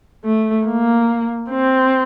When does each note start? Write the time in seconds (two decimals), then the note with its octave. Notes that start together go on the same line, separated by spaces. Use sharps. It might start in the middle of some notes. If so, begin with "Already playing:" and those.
0.25 A3
0.67 A#3
1.50 C4